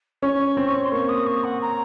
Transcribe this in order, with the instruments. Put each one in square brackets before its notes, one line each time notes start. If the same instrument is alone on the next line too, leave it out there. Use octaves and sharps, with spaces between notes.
[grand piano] C#4 [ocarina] C#6
[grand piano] C4
[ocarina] C6
[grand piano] A#3 [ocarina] C#6
[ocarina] D#6
C#6
F#5
A#5